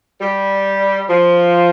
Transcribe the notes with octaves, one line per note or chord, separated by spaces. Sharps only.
G3
F3